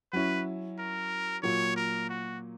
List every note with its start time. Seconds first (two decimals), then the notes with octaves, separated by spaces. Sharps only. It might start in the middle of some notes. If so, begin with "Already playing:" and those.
0.12 F#3 C#4 E4 B4
0.79 A#4
1.43 A#2 F#3 A#3 C#5
1.76 A#4
2.09 F#4